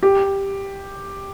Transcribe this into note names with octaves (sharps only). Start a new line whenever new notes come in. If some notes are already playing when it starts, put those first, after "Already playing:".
G4